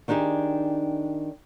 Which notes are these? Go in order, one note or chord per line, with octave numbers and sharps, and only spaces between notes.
D#3 D4 D#4 G4 G#4